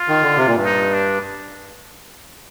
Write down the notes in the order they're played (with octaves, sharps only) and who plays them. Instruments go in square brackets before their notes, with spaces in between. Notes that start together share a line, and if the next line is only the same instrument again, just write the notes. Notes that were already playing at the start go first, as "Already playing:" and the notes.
Already playing: [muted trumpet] F4
[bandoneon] D#3
D3
C3
A#2
G2
[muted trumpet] D#4
D4